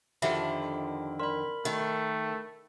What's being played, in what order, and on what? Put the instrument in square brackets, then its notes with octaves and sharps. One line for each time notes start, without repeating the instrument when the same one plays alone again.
[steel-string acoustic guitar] F2 D3 D#3 [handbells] F4 G4 B5 [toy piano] E5
[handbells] A#4 B5 [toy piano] D5 C6
[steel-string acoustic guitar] D#3 [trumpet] A3 [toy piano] D#5